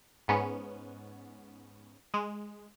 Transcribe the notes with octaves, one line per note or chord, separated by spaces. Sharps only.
G#2 B3 C#4
G#3